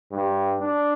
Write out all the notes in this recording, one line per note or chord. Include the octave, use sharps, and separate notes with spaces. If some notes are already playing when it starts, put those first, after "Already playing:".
G2
D4